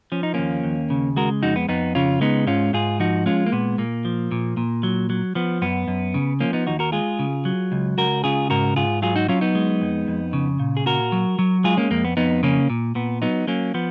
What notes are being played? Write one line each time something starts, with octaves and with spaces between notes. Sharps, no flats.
F3 C#4
D#4
D#2 A#3 C#4
D#2
C#3
G#3 F#4 A#4
F2 D#4 F#4
B3
F2 B3 D#4
C#3 C#4 F4
G#3 B3 D#4
G#2 C#4 F4
G#2 F4 G#4
F3 D#4 F#4
G#3 C#4 F4
A#3
A#2 B3
A#2 A#3
F3
A#2
A#2
F#3
F#3
F3 B3
F#2 B3
F#2
C#3
F3 A#3 C#4
B3 D#4
D#2 D#4 F#4
F#4 A#4
G#3 F4 G#4
C#3
F#3
C#2
C#2 F#4 A#4
C#3 F4 G#4
G#2 F#4 A#4
G#2 F4 G#4
F#3 F4 G#4
D#4 F#4
F#3 C#4 F4
B3 D#4
G#3
F2
F2
C#3
A#2
G#4
A#2 F#4 A#4
F#3
F#3
G#3 F4 G#4
A#3 C#4
F2 A#3
B3
F2 B3 D#4
C#3 A#3 C#4
A#2
A#2 B3
F#3 B3 D#4
F#3 A#3 C#4
F3 B3